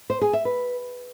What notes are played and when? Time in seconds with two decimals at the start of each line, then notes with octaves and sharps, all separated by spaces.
0.10 C5
0.21 G#4
0.33 E5
0.45 B4